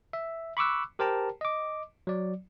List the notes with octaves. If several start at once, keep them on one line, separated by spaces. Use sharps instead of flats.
E5
B5 C#6 D6 E6 F#6
G4 A#4 C5 G5 A5 A#5
D#5 D6
F#3 D5